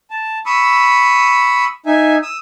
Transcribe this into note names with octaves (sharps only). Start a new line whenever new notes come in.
A5
B5 C#6 D#6 E6
D#4 E5 G#5
D#6 E6